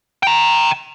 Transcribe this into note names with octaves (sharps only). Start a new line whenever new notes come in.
G5 A#5